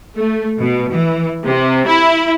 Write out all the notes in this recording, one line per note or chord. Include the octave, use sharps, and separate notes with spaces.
A3
B2
E3
C3
E4